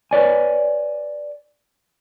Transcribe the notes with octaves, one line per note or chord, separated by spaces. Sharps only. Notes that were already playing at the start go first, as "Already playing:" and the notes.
B4 C#5 D5 G#5